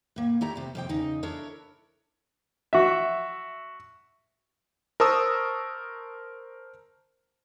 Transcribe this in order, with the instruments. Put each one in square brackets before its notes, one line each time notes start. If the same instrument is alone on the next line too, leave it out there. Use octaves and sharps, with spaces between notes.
[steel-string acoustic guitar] A2 A#3
A3 E4 G4 D5 A#5
C3 B3
F2 C3 G5
E2 C#3 D#4
D4 E4 A4 A#4 C#5
[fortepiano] F#4 E5
[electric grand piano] A#4 C5 A5 C#6 D#6 E6